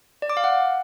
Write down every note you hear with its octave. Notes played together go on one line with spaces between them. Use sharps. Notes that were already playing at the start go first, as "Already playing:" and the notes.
D5
D6
F5
F#5